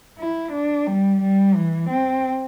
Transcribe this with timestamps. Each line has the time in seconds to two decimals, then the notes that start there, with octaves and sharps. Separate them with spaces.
0.19 E4
0.52 D4
0.87 G3
1.21 G3
1.56 E3
1.90 C4